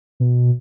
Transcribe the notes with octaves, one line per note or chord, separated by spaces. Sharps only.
B2